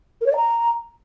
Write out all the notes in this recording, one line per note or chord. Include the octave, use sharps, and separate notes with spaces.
A#4
C#5
D5
A#5